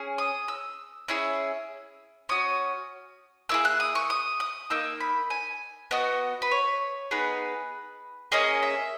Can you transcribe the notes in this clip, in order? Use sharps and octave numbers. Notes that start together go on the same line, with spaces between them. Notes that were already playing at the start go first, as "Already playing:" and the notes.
Already playing: C#4 G#4
D#6
E6
C#4 E4 G#4 E6
C#4 F#4 D#6
A#3 E4 G#4 E6
F#6
D#6
C#6
D#6
D#6
A#3 D#4 E6
B5
G#5
B3 F#4 D#5
B4
C#5
B3 D#4 G#4 B4
A#3 C#4 G#4 D#5
E5